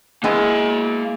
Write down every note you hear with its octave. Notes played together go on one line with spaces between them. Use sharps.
G#3 A#3 B3 E4 G#5